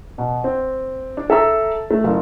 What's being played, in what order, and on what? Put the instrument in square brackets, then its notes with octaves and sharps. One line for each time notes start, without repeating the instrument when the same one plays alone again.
[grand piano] B2
C4
D4
A4 E5 A#5 E6
A3
F#1 F4